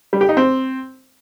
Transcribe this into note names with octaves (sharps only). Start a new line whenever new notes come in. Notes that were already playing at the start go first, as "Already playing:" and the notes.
G3
G4
D#4
C4